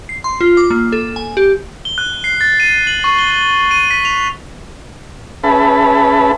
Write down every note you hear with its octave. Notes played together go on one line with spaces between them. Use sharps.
C7
C6
F4
D6
A#3
A4
G#5
G4
G7
F#6
C7
A6
D#7
F#7
C#6
G7
G7
D#7
B6
F7
C#4 G#4 B4 E5 A5 B5